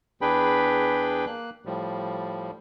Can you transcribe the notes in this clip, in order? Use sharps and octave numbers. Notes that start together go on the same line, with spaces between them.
E2 D4 G#4 B4 G5 B5
A#3 F#6
A2 F3 G3